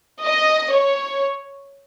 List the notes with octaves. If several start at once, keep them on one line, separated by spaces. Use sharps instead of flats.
D#5
C#5